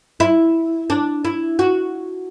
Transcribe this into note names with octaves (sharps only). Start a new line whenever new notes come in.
E4
D4
E4
F#4